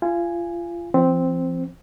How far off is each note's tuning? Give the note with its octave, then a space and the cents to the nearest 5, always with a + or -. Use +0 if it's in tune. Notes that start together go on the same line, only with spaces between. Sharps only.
F4 -30 G#5 +0
F3 -40 C4 +0